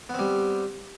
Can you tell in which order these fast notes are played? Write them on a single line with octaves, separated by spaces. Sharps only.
B3 C4 G3